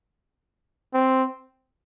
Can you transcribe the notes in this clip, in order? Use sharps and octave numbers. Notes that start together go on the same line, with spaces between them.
C4